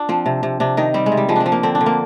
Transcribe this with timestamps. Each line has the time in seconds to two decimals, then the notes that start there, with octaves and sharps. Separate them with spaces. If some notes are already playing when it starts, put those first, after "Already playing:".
Already playing: D4 F4
0.09 F3 C4
0.26 C3
0.43 C3
0.60 C3 D4
0.77 D#3 D#4
0.94 G3 C4
1.06 G#3
1.12 C3
1.17 G3
1.29 F3 G#3
1.36 C4 D4
1.46 F3
1.52 A#3
1.63 D3 C4
1.75 D4
1.81 D3
1.86 A#3